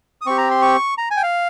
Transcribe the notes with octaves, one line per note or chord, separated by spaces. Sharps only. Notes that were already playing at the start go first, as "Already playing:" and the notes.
D#6
C4 G4 C#6
A#5
C6
C#6
A#5
G#5
G5
F5